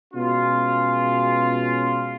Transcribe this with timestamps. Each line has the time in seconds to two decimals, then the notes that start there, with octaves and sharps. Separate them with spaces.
0.14 B2 G#3 C#4 F4